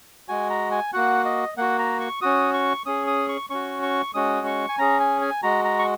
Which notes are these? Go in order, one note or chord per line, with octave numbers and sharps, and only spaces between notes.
G#3 F#4 G#5
A#5
G#5
A#3 F#4 F#5
D#5
A#3 F#4 F#5
A#5
C#6
C#4 F#4 D#6
C#6
C#4 G#4 D#6
D#6
C#6
C#4 F#4 C#6
C#6
G#3 C#4 F#4 D#6
C#6
G#5
C#4 G#4 A#5
G#5
G#5
G#3 F#4 A#5
A#5
C#6